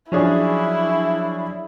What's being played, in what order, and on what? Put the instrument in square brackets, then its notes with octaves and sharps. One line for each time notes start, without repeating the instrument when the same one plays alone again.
[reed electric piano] F3 F#3 [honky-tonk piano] C#4 D4 G#4 [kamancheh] E4